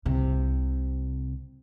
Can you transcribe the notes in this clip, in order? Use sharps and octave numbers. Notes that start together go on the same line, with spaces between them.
C2 C3